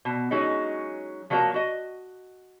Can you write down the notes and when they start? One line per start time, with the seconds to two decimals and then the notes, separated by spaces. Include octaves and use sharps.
0.05 B2
0.31 F#3 G#3 C#4 D#4
1.30 F3 F#3 A#3 C#5 A5 A#5
1.54 F#4 D#5